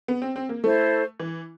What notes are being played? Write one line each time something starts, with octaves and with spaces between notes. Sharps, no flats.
B3
C4
C4
A#3
A3 E4 A4 C5
E3